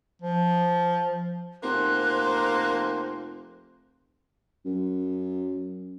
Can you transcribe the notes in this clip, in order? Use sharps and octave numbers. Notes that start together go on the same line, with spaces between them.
F3
F1 A#3 C5 F#6
F#2